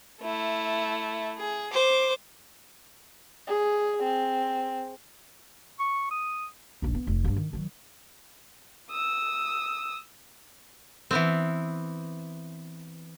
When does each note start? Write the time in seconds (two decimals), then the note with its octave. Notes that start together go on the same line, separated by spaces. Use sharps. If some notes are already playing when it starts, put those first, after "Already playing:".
0.21 A3 E4
1.38 G#4
1.73 C5 D6
3.47 G#4
4.03 C4
5.79 C#6
6.11 D#6
6.82 D#1 A#1
6.94 B3
7.07 F1
7.25 G2 G#3
7.36 D#3
7.53 D#3 F#3
8.91 D#6 E6
11.11 E3 B3 C4